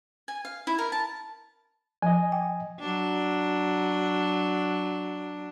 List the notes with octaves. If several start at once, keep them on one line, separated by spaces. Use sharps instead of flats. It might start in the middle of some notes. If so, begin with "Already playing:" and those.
G#5
F5
E4
A#4
A5
F3 D#5 G#5
G5
F#3 D4